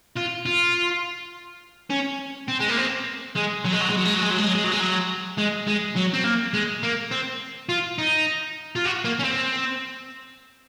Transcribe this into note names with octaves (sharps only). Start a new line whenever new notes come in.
F4
F4
C#4
C4
G#3
A#3
C4
G#3
F#3
G#3
F#3
G#3
F#3
G#3
F#3
G#3
F#3
G#3
F#3
G#3
F#3
G#3
F#3
G#3
G#3
F#3
C4
A#3
G#3
A#3
C4
F4
D#4
F4
F#4
A#3
C#4
C4